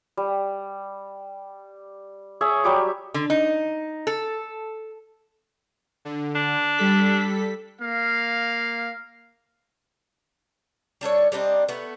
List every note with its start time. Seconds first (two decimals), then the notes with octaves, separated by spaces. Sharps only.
0.17 G3
2.41 G#4 C#5 E5
2.64 F#3 G3 G4 C#6
3.14 D3
3.30 D#4
4.07 A4
6.05 D3
6.35 D4
6.77 G3 A4 B6
7.81 A#3 F5
11.01 G3 D4 A4 C#5
11.32 G3 C4 D4 D#4
11.68 A3 B3